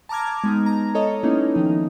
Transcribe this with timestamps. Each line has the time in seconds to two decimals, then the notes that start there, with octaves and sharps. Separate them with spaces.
0.09 A5 A#5 D6 F6 G#6
0.44 G#3 B3 D#4
0.66 A#5
0.95 A4 C#5 D#5
1.23 A#3 B3 C#4 D#4 E4
1.55 D#3 F3 D#4